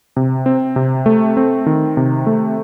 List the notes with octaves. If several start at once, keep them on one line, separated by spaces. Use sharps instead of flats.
C3
C4
C3
A3
C4
D#3
C3
A3